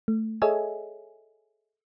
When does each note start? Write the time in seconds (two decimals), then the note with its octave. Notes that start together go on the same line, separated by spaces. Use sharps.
0.08 A3
0.42 G#4 A4 C#5 D#5 E5 G#5